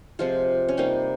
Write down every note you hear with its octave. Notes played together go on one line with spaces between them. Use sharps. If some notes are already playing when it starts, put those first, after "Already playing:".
C3 F3 G#3 F4
C#4
C3 G3 A#3 D#4